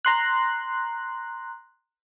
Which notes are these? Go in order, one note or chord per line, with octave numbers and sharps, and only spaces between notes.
A#5 C6 F#6